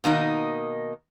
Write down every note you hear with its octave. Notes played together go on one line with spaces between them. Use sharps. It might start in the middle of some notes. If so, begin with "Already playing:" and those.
B2 D#3 A#3 D#4